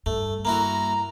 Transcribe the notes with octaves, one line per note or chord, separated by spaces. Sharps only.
G2 A3
A#3 E4 F#4 A#5